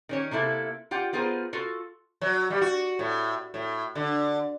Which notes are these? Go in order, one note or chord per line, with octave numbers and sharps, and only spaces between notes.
D#3 C#4 C#5
C3 A#3 E4 A4
F4 G4 F#5 G5
B3 F4 G#4 A#4 C5
F4 F#4 A4
F#3
G3
F#4
A2
A2
D3